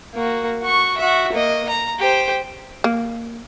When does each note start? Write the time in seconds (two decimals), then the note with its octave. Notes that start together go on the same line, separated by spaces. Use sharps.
0.15 A#3 F#4
0.62 F#4 C#6
0.97 F#4 E5
1.33 A#3 D#5
1.69 A#5
1.99 G4 C5
2.84 A#3